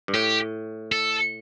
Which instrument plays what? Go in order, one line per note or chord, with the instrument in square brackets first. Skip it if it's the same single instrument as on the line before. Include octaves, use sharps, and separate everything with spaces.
[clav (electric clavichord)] G2
[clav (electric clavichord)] A2 [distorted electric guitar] G4
[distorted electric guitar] A4